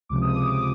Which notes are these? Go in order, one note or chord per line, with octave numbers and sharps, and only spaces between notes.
C#2 C3 F3 D6
D#6
D6
D6